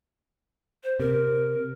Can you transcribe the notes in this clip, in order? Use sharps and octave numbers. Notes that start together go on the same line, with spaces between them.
C5
C3 A#4